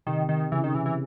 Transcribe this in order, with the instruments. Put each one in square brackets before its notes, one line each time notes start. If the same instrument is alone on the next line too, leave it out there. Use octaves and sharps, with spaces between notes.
[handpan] C3 [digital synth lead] D#3
[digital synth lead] D#3
[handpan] C#3 [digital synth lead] E3
[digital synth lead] D#3
[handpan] C3 [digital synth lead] E3
[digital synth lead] E3